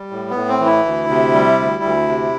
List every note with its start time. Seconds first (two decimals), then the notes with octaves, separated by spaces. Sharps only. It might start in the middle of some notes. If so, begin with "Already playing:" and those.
Already playing: G3
0.11 A2
0.30 A2 B3
0.48 C4
0.60 E3
0.66 E4
0.85 D2
1.10 C3
1.33 G3
1.59 D2
1.83 D2
2.08 C3